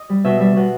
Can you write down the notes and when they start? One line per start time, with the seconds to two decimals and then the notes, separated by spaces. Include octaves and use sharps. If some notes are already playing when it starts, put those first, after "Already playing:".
Already playing: D#5
0.09 G3
0.24 B2 E5
0.40 G3 E5
0.56 B2 F#5